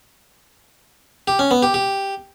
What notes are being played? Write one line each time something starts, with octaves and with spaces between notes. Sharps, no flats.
G4
C#4
B3
G4
G4